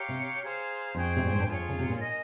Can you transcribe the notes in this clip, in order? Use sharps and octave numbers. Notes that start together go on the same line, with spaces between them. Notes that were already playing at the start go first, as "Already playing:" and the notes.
Already playing: G4 C#5 F5 A#5
C3
G#4 C5 F5 A#5
F2 G#4 C5 G5 C#6
C3
A#2
G#2
G2
F2 F4 G#4 C#5
C#3
C3
A#2
A#4 D#5 G#5